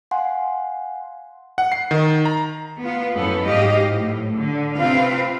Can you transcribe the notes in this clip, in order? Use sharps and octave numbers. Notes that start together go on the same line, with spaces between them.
F5 F#5 G#5 C6
F#5
C7
D#3
A#5
B3 F4
F#2 E3 B3 A4
G#2 F#3 G4 D#5 F5
A2
D3
C3 C4 F4 B4 F5